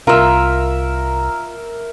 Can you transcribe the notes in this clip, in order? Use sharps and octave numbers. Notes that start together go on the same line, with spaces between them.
C2 F4 A#4 E5